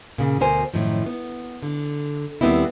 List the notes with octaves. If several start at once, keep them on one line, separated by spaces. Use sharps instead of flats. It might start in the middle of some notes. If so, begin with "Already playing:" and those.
A#2 C#3
D2 B2 A#4 C5 G#5
F#2 A2 D#3 F3
B3
D3
D#2 G3 B3 C4 D#4 E4